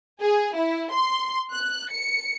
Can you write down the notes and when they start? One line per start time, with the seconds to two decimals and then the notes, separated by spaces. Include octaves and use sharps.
0.21 G#4
0.56 E4
0.92 C6
1.53 F#6
1.90 C#7